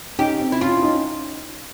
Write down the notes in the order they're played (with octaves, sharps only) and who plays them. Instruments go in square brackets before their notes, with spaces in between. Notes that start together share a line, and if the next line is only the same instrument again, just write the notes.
[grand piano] C#4 D#4 [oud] G4
[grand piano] C4
[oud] E4
[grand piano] C#4 [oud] F4
[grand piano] E4
C#4 D#4